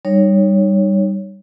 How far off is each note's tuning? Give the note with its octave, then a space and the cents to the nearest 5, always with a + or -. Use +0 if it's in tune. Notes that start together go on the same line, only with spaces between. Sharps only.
G3 +0 D#4 -20 C#5 +0